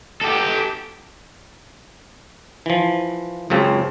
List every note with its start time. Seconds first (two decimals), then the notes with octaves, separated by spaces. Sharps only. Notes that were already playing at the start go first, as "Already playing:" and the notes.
0.21 G4 A4
2.66 E3 F3
3.50 C#2 F#2 C#3 C4 A5